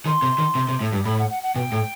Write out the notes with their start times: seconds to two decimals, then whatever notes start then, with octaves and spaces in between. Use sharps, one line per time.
0.06 D#3 C6
0.22 C3
0.38 D#3
0.55 C3
0.69 C3
0.81 A2
0.93 G2
1.05 A2 B5
1.18 F#5
1.30 F#5
1.42 F#5
1.55 B2 G5
1.72 A2